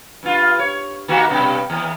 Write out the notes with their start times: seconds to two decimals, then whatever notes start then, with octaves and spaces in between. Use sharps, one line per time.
0.23 G2 F4
0.59 C#5
1.08 D#3 A#3 F#4
1.29 G2 B2 G3
1.70 D#2